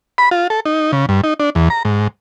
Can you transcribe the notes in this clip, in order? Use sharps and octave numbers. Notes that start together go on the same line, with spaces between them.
B5
F4
A4
D#4
C#3
G2
D#4
D4
E2
A#5
G#2